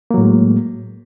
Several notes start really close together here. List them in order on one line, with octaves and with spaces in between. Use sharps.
A#3 F#3 A2 G#3